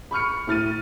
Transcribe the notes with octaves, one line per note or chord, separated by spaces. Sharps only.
B5 C#6 F6 C#7
A2 F6 A6 D#7